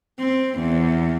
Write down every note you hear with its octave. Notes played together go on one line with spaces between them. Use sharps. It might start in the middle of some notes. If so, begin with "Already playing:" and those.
C4
E2